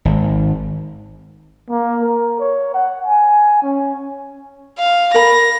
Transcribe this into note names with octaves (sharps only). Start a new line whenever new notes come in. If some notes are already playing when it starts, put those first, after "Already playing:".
G#1
A#3
A#4
C#5
F#5
G#5
C#4
F5
A#4 B5 A#6